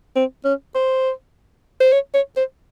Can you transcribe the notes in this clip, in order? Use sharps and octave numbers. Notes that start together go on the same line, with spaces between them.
C4
C#4
C5
C5
C#5
C#5
C5